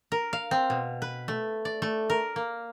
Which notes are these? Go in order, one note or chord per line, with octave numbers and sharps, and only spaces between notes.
A#4
F5
C4
B2
B4
A3
D5
A3
A#4
A#3